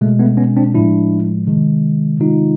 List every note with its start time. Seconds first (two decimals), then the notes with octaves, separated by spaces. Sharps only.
0.01 B2 G#3 A3
0.19 A3 B3
0.37 B3 C#4
0.56 C4 D4
0.74 A2 F3 G#3 D4 E4
1.47 C3 D#3 G#3
2.20 C3 D#3 G#3 D#4 F4